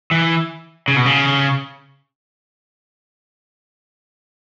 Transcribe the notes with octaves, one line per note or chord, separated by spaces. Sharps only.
E3
C#3
B2
C#3